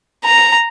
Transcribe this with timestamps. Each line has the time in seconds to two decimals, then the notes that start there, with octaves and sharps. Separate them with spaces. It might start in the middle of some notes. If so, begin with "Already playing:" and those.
0.25 A#5